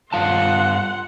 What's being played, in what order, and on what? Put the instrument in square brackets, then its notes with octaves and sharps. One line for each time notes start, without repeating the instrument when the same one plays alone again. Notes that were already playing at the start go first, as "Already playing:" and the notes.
[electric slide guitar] G2 F4 A5 [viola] F#5 C6